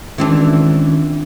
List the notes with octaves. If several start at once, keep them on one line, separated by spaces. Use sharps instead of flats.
C#2 D#3 E3 C4 D4